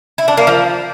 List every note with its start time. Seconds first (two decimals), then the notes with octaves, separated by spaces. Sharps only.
0.18 E4
0.28 D4
0.37 A#3
0.47 F3